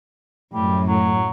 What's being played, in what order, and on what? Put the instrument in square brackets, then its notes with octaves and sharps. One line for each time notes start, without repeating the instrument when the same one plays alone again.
[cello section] F#2 A2 [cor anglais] G3
[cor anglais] F#3